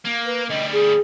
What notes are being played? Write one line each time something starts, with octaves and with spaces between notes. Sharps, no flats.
A#3
B4
D2 G3 D#5
G#4